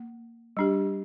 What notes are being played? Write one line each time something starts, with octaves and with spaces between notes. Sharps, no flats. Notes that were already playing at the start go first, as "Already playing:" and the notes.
Already playing: A#3
G3 D4 G4